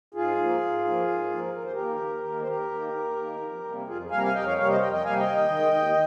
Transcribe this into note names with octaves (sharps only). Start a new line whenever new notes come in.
G#2 F4 G#4
F3 A#3
G#2
F3 A#3
G#2
F3 A#3
D#2 A#4
C5
G4 A#4
D#3 A#3
D#2
D#3 A#3
C5
D#2 G4 A#4
D#3 A#3
D#2
D#3 A#3
F2
C3 G3 A#3
F2 F4 G#4
C3 G3 A#3 F5 G#5
A#5
F5 G#5
F2 D#5 G5
C#5 F5
C3 G3 A#3 C#5 F5
C5 D#5
F2 D#5 G5
D#5 G5
C3 G3 A#3 F5 G#5
D#5 G5
D#2
D#3 G#3
D#2